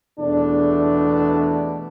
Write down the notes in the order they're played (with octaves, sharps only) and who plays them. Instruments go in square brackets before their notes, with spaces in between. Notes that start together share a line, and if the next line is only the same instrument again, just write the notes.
[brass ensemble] E2 B2 A3 D4